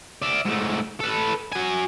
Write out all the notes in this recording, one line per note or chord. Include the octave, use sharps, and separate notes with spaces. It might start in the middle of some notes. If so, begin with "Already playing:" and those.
D5 E5
G#2 A3
A4 B4
F#4 G#5